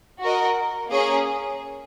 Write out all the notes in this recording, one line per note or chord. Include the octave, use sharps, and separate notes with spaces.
F#4 A#4 D#5
A#3 C#4 G#4 C#5